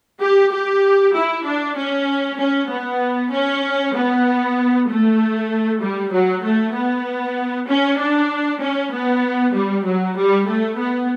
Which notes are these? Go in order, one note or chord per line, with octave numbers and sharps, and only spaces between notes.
G4
G4
E4
D4
C#4
C#4
B3
C#4
B3
A3
G3
F#3
A3
B3
C#4
D4
C#4
B3
G3
F#3
G3
A3
B3